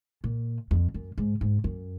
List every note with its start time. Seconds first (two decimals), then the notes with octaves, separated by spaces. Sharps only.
0.24 A#2
0.71 F2
0.94 F#2
1.18 G#2
1.41 G#2
1.64 F#2